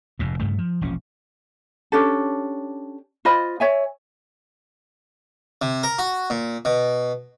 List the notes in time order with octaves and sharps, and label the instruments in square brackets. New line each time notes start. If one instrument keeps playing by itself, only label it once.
[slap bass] F1 F2 G#2
G2 C#3 A3
F3
E1 A#1 F3 C#4
[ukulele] C#4 D4 G4 A4
F4 C5 D#5 B5
C#5 E5 G#5
[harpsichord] C3
A#4
F#4
A#2
B2